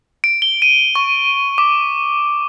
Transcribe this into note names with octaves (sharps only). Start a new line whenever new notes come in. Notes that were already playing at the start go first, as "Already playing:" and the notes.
D7
G7
D#7
C#6
D6